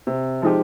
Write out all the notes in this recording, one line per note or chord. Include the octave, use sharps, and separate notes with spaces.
C3
F3 G#3 D#4 G4